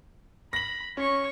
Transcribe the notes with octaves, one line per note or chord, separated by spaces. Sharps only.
B5 A#6 F#7
C#4 C#5 C#6